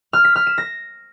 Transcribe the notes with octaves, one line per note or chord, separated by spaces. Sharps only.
F6
B6
F6
E7
A#6